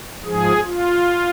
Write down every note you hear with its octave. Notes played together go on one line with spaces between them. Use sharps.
G#2 F3 G#4
F4